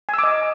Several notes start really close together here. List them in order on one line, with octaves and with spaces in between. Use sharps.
G#5 E6 D6 D#5